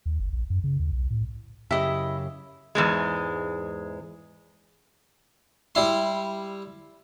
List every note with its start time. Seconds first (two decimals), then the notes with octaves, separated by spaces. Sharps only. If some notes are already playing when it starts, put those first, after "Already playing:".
0.06 D#2
0.19 G1
0.33 A#1
0.50 F#2
0.64 C#3
0.79 D#2
0.92 B1
1.10 A2
1.71 F#2 C#3 E4 G4 D#5
2.75 E2 G#2 G#3
5.75 G3 E4 C6